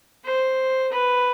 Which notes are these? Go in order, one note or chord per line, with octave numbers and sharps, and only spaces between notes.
C5
B4